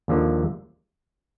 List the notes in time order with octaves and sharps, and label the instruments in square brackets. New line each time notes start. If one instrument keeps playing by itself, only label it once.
[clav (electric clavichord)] D#2 D3 F3 A#3